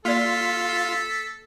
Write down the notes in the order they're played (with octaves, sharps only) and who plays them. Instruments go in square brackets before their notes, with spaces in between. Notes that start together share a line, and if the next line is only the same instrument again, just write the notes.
[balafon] A#3 D5 [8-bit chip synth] F4 F5 C6 [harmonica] A4 [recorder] B6